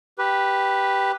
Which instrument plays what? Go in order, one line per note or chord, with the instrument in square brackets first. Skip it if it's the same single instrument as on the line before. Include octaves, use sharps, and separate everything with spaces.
[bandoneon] G4 B4